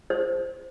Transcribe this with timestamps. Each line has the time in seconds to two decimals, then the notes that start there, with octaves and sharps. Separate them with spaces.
0.10 C5